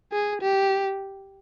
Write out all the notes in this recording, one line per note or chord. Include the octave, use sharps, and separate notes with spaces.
G#4
G4